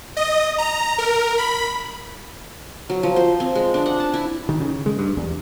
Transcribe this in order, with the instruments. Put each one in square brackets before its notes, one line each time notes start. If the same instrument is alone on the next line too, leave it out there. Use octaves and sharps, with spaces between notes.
[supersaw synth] D#5
A#5
A#4
B5
[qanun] F#3
F3
C5
C4
G#3
D4
F#5
A5
E4
[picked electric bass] D#3
C#3
G#3
G2
E2